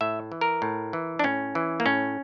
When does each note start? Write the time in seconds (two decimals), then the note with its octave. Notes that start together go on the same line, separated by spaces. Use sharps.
0.01 A2 E5
0.32 E3
0.41 A#4
0.62 A2
0.93 E3
1.19 D4
1.24 A2 C#4
1.55 E3
1.80 A#3
1.86 A2 C#4